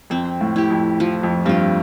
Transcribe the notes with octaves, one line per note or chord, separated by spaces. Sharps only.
F2 C4
A2
E4 G4
F2
F3
F2
G2 C4 F4